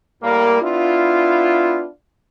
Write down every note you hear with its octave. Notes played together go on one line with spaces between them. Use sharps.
A2 G3 A#3
B3 D4 E4 F4